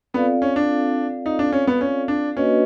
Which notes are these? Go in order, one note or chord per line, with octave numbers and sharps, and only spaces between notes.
B3 C4 F4 A4 D5 F5
C#4
D4
D#4
D4
C#4
B3
C#4
D4
A#3 C#4 D4 F#4 B4 D#5